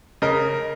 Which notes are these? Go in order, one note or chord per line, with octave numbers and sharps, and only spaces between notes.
C#3 A#4 D#5